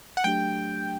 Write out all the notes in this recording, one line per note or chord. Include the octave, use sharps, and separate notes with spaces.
F#5
F#3 A3 D4 G4 G5